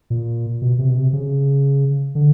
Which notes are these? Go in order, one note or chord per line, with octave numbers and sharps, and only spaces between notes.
A#2
B2
C3
B2
C3
C#3
D3